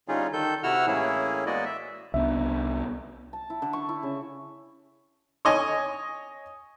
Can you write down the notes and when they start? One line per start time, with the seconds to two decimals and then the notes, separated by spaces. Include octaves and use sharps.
0.08 D3 G3 C#4 D#4 F4 G#4
0.33 D#3 A4 G6
0.63 C3 E4 F#4 F#5 E6 F6
0.87 A2 E3 A#3 C#4 E4 G#4
1.46 G#3 A#3 B3 F#4 D5 D#5
1.65 E5
2.14 C2 B3 D4 E5
3.33 A5
3.50 E4
3.62 D3
3.73 C#6
3.89 E4
4.03 C#3
5.45 C#5 D#5 G#5